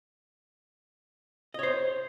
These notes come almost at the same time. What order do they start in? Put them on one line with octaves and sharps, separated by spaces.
D#5 C#5 C5